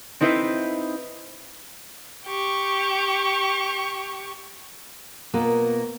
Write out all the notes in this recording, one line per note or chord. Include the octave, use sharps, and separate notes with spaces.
C4 D#4 E4 B4 C5
G4 C#6
B2 A#3 B3 F4 A#4